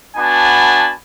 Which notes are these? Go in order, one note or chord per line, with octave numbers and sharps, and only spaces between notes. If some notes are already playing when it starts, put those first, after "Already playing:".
B3 D4 F#4 G#5 A5 B5